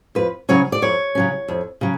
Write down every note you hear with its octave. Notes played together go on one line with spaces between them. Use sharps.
F2 B4
C#3 F#3 C#4 C#5
D5
F2 C#5
C#3 F#3 C#4
F2
C#3 F#3